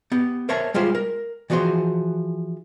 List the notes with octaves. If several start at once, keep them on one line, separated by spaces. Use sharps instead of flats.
B3 G4
A#4 C5 C#5 E5 A5
G3 G#3 F4 G4 C5
A#4
E3 F3 F#4 G#4 C5